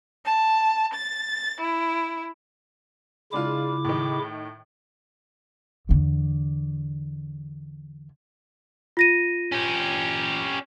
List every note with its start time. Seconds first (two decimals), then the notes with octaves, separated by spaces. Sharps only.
0.25 A5
0.94 A6
1.61 E4
3.33 C#3 G#3 D4 E4 F4 D6
3.85 A2 D#3
5.89 E2 D3
8.97 F4 A#6 D#7
9.52 C#4 G4